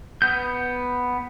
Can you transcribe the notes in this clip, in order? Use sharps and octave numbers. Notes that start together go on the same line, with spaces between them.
B3 G6